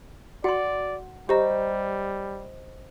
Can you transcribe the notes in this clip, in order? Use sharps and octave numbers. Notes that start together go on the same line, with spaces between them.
F#4 D5 F#5 C6
G3 G4 C5 D#5 A#5